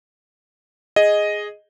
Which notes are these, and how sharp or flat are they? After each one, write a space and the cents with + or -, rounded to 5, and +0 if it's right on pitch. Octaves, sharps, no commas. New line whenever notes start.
G#4 +0 D#5 +0